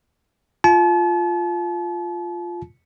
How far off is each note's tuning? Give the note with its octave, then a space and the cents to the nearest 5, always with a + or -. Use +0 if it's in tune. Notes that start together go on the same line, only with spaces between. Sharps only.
F4 +0 A5 -40